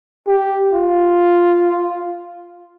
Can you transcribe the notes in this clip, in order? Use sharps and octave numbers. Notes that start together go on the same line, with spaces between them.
G4
F4